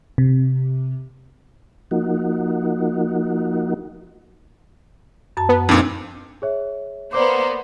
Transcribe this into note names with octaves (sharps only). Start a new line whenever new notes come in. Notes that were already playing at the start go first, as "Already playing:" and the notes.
C3
F3 A#3 D#4 F#4
F#2 A5
B3
F2 A#2 C4 D4 D#4
G#4 C#5 E5
A#3 B3 C5 D5 D6